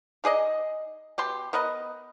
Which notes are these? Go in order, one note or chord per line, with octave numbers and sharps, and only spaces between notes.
D#4 G#4 D5 D#5
B2 G4 C6
B3 A#4 B4 D#5